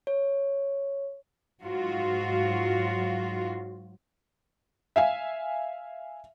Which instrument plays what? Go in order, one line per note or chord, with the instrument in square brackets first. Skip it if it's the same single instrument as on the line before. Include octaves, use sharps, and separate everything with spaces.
[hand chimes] C#5
[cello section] G#2 F#3 F4 F#4
[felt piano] E5 F5 G#5